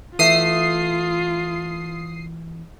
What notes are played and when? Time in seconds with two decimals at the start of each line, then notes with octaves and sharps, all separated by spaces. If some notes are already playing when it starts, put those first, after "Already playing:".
0.19 E3 A3 F4 E5 D#6 C7